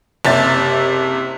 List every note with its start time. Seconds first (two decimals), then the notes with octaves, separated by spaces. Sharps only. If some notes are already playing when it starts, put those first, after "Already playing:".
0.25 F#1 C3 G4 E5 A6